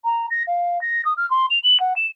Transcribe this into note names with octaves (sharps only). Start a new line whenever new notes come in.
A#5
A#6
F5
A#6
D#6
F6
C6
F7
F#7
F#5
E7